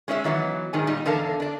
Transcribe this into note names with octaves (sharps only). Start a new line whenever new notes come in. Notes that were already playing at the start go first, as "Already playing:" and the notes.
G#3 C#4 G#4 D5 E5
D#3 E3 F#3 B3
G#2 D#3 G#3 G#5
A#2 G3 D#4
E2 D3 A4 A#4 F5 A5
D4 D5